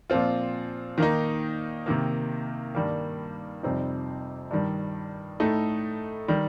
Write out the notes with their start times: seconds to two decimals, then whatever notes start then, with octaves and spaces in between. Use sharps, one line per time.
0.10 A#2 F3 C4 F4
0.98 D#3 A#3 D#4
1.86 C3 D#3 A#3
2.75 G2 D#3 G3 A#3
3.63 F2 C3 G3 C4 D#4
4.51 G2 D#3 G3
5.40 A2 A3 D#4
6.28 D#3 G3